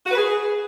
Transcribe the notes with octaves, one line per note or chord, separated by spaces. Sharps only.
F#4
B4
G#4